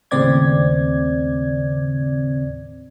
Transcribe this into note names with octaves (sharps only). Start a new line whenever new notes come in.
D#2 A2 C#3 C4 D5 G#6